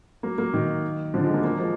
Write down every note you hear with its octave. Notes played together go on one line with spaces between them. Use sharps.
F#3 A#3
F#3 A#3
D#3 F#3
D3 F3
F3 G#3
F#3 A#3
F#3 A#3
F3 G#3